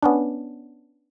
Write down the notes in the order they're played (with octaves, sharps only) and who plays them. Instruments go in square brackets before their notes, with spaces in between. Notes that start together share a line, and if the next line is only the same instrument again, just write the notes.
[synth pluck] B3 C#4 D4